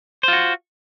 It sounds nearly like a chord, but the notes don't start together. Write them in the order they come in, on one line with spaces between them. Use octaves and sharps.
C5 F4 F#4